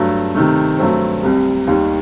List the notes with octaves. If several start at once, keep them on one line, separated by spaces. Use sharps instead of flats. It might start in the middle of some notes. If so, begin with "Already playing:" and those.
Already playing: G2 F#3 A3
C3 D#3 A3
G2 F#3 A3 C4
C2 C3 G3
D#2 D#3 G3